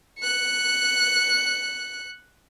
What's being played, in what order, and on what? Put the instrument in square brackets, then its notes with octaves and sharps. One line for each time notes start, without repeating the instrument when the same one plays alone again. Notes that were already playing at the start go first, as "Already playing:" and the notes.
[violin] F#6 C#7